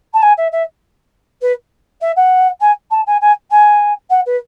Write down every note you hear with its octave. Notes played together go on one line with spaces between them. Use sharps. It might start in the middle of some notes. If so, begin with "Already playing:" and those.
A5
G#5
E5
E5
B4
E5
F#5
G#5
A5
G#5
G#5
G#5
F#5
B4